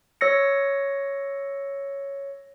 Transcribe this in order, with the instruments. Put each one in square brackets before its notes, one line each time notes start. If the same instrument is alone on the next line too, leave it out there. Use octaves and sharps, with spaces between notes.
[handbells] C#5 E6 A#6 C#7